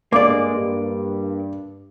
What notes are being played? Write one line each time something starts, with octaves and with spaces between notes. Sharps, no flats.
G2 G#3 A#3 D5 D6
G2